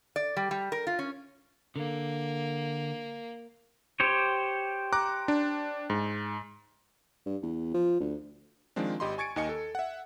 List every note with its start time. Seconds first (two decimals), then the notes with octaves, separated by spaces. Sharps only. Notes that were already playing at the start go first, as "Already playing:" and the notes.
0.16 D5
0.37 G3
0.51 G3
0.72 A#4
0.87 F4
0.99 C#4
1.76 D3 A#3
4.00 G4 C5 C#5
4.93 A#5 D6 F#6
5.28 D4
5.90 G#2
7.26 G2
7.43 E2
7.74 F3
8.00 D2
8.76 D#3 F3 G#3 C4 D4
9.00 G#1 G4 D#5 B5 C6
9.18 G#5 C#6 G#6 A6 C#7 D7
9.36 D#2 D#3 D#5 G#5 C#7
9.49 A4
9.75 E5 F#5